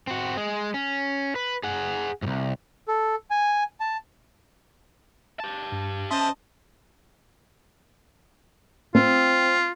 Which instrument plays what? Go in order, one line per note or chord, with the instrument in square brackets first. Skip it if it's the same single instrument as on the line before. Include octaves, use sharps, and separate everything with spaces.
[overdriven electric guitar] C4 F#4
G#3 G#4
C#4
B4
G#4 F#5
C2 G#2
[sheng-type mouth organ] A4
G#5
A5
[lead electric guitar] G4 A5
[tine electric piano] G2
[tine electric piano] C#4 C6 [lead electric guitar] C5 E5 [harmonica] D#5 A5
[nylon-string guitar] C4 [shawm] F4